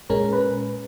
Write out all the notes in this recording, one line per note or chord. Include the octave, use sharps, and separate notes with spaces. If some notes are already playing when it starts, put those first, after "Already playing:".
A#2 G#3 C#4 A#4
B4